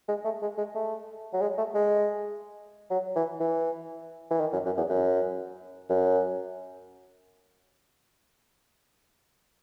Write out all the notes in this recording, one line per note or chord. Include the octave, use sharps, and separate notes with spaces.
G#3
A3
G#3
G#3
A3
F#3
G#3
A3
G#3
F#3
E3
E3
E3
D#3
F#2
F#2
E2
F#2
F#2